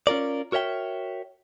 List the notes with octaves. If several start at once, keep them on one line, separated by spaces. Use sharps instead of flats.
C#4 F4 A#4 D5
F#4 A#4 C#5 E5 G5